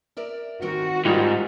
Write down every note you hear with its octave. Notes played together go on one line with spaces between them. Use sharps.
A#4 D5 E5
D#3 C4 F#4 A#4
G#2 G3 F4